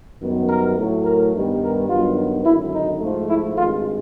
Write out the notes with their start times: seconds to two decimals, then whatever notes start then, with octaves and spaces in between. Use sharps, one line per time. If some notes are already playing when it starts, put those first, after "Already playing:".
0.21 F#2 D#3 G3 B3
0.49 A#4
0.77 A2 F#3 A3
1.05 A#4
1.34 G2 D#3 G3 B3
1.62 A#4
1.90 G2 D#3 F#3 B3 F4
2.46 G#1 F#2 D3 E4
2.74 D#4
3.01 G#2 F3 A3
3.29 E4
3.58 G#1 G2 D#3 G#3 F4